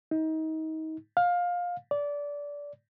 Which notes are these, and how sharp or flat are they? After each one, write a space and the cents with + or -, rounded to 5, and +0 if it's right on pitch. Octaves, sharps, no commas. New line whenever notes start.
D#4 +30
F5 +20
D5 -20